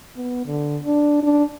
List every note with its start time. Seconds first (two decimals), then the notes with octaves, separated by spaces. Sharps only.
0.16 B3
0.46 D3
0.84 D4
1.23 D4